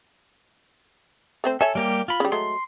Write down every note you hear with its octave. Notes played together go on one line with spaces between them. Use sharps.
A3 C4 C5
A4 C#5 E5 G#5
G3 A#3 G4
F4 B5
C#3 G3
F#3 G#3 A3 C6